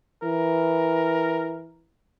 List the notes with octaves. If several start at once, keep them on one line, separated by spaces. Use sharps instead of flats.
E3 A#4